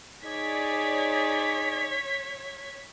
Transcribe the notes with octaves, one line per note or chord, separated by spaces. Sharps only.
D#4 G#4 C#5 D5 G#6 B6